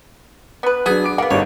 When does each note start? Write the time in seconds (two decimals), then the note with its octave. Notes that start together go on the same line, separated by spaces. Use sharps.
0.63 B3 B4
0.86 F#3 B3 D4 G#4 G#5 D#6
1.04 D6 D7
1.18 A#3 B3 F#5
1.31 G1 G3 D4 D#4 C#5